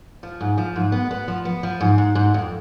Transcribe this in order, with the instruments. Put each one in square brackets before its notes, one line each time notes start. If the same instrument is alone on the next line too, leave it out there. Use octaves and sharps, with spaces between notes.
[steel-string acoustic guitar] F3
G#2
F3
G#2
B3
B3
F3
B3
F3
G#2
G#2
G#2
F2